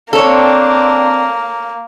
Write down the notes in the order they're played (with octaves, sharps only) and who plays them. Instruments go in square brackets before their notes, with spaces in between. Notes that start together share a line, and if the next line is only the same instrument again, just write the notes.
[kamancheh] A#3 [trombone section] C4 D4 [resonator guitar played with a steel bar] A4 C#5